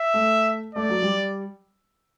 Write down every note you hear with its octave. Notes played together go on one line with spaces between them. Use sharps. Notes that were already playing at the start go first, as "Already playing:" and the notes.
Already playing: E5
A3
A3 D5
F#3
G3